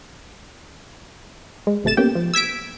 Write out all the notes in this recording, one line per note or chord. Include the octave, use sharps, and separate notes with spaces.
G#3
A1 C3 A3 A6 E7
A#3 B3 C#4 G4 G5
F3
E6 G#6 B6 D7